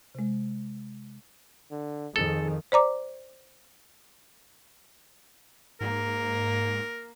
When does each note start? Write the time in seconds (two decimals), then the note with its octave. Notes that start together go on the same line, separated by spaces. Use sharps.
0.15 C3 G#3
1.71 D3
2.16 F2 D#3 G#4 A4
2.72 C5 D5 A#5 D6
5.81 G#2 A#3 A#4